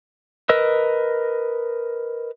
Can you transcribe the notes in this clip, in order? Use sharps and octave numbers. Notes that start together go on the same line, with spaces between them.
A#4 B4 D#5 E6